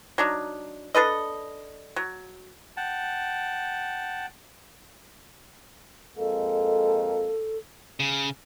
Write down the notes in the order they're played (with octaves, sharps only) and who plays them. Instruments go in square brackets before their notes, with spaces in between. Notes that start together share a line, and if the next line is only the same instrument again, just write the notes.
[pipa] F#3 D4 D#4
D4 A4 B4 D#5
F#3
[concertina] F#5 G5 A5
[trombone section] F2 G#3 A#3 [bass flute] A4
[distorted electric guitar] C#3